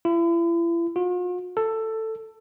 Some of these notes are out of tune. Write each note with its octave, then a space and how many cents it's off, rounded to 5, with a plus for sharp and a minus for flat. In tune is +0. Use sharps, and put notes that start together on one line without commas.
E4 +40
F4 +45
A4 +10